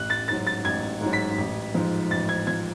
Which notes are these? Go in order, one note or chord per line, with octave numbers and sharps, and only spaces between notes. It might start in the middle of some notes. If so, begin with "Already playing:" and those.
Already playing: A1 F#6
A6
G#2 F#3 A6
A6
A1 G#6
G#2
F#3
B6
A1
G#2 F3
A1 A6
G#6
F3 G#6